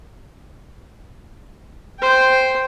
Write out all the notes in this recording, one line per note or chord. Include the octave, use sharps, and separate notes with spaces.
C5 G5